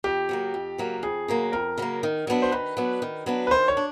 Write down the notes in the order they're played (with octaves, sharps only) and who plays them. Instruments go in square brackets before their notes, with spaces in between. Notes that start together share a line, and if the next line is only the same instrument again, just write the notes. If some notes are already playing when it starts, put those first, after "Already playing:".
[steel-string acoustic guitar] F2 [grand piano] G4
[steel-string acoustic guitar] C#3 F#3 A#3
F2
C#3 F#3 A#3
[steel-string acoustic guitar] F2 [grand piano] G#4
[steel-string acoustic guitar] C#3 F#3 A#3
[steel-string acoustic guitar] F2 [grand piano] A#4
[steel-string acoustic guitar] C#3 F#3 A#3
D#3
F#3 B3 D4
[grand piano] C5
[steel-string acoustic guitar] D#3 [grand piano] B4
[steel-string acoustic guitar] F#3 B3 D4
D#3
F#3 B3 D4
[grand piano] B4
[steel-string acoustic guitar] D#3 [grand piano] C5
[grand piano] C#5
[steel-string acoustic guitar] D4